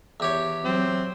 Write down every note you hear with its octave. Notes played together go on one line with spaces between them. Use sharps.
E2 G4 C#5
F#3 C4